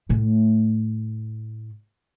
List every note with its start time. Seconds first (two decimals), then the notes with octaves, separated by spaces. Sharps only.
0.09 A2 A3